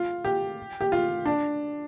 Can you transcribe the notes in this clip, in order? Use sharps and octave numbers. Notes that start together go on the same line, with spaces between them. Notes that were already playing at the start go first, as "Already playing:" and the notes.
Already playing: F4
G4
G4
F4
D4